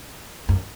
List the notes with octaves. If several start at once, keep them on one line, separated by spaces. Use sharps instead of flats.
F#2